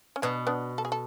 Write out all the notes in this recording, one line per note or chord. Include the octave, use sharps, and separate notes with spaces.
C#4
B2 B3 D4
B3 D4
A4
G#4
A4